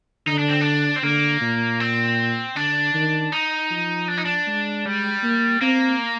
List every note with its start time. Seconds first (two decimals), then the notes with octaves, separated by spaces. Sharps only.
0.27 D3 D#4
0.39 D4
0.49 C4
0.61 D4
0.96 C4
1.03 D3 A#3
1.41 A#2
1.80 C4
2.56 D3 D4
2.94 D#3
3.32 D#4
3.71 F3
4.08 D4
4.18 D#4
4.25 D4
4.47 G#3
4.86 G3
5.23 A#3
5.61 A#3 C4